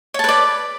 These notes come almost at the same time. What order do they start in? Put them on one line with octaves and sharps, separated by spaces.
C#5 A5 B4 D5